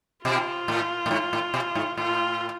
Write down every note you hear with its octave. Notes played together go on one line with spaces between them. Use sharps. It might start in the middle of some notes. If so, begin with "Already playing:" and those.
B2 F4
A2
A2
G#2
A2
B2
G#2
A2 F4